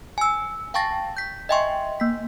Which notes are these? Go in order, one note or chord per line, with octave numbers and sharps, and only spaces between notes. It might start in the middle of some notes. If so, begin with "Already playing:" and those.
G#5 E6
F5 G5 A5 C#6 A6 A#6
G6 B6
D#5 E5 G5 G#5 C6 C#6
A#3 B6